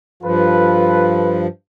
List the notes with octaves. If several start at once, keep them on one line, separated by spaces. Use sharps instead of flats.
G2 F3 F4 A4 B4